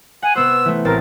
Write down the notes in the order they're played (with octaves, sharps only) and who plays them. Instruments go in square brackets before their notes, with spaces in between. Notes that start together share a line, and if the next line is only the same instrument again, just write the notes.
[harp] F#5 [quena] G#5
[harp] C3 B3 C5 [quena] E6
[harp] E3 A3
[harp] A1 C4 A6 [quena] A#4